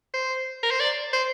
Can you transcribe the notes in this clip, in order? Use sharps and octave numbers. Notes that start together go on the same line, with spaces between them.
C5
A#4
C5
D5
C5